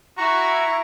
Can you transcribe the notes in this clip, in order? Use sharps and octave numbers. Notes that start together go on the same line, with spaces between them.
E4 F#4 A#5 C#6